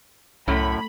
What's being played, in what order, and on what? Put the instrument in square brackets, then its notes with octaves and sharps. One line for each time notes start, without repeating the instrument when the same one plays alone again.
[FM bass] C2 [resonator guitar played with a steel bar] F#2 A2 [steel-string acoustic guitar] A3 [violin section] B5